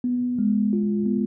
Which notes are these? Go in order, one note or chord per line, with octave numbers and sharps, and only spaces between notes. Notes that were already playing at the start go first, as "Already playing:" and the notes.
B3
G#3
F4
B3